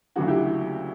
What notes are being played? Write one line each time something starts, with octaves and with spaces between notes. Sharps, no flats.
D2 C#3 F#3 F#4
E4 G4